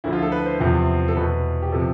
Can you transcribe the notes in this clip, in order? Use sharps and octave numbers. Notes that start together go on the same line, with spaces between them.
D2 D3 F3 E4
F4
A4
B4
C5
E2 C3 F3
A4
E2 B2 B4
G4
C3 F3 A4